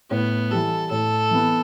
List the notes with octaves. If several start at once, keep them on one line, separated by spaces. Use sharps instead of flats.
A2 B3
E3 G3 A4
A2 A4
E3 B3